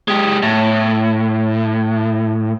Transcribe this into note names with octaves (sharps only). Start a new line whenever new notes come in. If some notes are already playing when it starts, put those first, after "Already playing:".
G#3 G4
A2